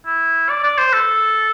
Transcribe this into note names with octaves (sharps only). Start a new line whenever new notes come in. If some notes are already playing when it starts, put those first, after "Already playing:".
E4
D5
D5
C5
A4